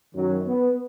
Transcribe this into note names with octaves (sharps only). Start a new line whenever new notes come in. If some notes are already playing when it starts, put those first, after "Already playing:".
F#2 D#3 F#3
B3